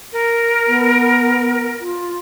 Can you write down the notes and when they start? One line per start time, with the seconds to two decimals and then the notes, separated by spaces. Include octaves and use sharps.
0.13 A#4
0.67 B3
1.81 F4